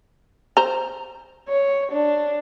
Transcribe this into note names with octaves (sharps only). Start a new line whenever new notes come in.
C5 A#5
C#5
D4